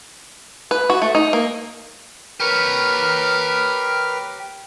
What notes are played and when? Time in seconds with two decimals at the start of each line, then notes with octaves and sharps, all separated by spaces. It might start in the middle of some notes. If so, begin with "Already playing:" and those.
0.71 B4
0.90 F#4
1.02 A3
1.15 D#4
1.33 A#3
2.40 G4 A#4 B4 C#5 F6